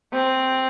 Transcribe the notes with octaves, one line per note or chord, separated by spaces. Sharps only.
C4